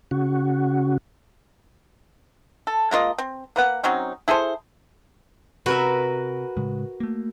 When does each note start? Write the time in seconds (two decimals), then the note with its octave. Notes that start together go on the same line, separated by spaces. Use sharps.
0.11 C#3 F#4
2.67 A4
2.91 G#3 A#3 F4 D#5
3.18 C4
3.56 A#3 B4 F#5
3.83 F#3 C4 C#4 D#4
4.28 E4 G#4 A4 C5
5.66 C3 F#4 A#4 B4 E5
6.57 A2 C#3 G#3
7.00 A3 A#3